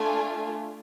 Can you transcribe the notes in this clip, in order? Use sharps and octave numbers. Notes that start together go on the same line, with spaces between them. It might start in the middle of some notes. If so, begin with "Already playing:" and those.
Already playing: A3 D4 F4 A4 G#5